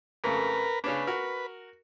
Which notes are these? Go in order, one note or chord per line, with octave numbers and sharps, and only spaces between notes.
F2 C#3 A3 A#4 B4
C#3 C#4 D4 B4
F#4 A#4